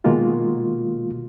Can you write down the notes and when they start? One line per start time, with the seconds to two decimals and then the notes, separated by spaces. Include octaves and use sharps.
0.04 B2 D#3 G#3 A#3 F4 F#4